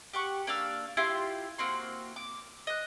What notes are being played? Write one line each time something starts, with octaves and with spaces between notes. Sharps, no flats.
G4 F#5 C#6
A#3 D4 F5 E6
E4 F4 G4 C6
A#3 C4 F#4 C6
D6
D#5 F#6